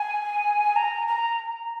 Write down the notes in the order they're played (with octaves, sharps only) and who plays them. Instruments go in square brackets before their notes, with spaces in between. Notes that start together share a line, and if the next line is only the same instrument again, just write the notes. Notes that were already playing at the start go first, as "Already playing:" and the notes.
Already playing: [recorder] G#5
A#5
A#5